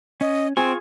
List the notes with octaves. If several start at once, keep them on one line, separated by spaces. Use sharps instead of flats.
C#4 D#5
C4 F4 G#4 G#5 C#6